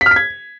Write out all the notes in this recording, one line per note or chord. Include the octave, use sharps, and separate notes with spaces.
B6
F6
B6
G#6